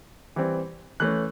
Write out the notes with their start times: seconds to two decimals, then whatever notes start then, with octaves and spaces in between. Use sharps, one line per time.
0.36 E3 G3 C4
1.00 E3 A3 C#4 F#6